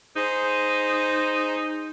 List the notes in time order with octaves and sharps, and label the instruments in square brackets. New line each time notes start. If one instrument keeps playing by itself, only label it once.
[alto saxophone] D#4 [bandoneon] G#4 C5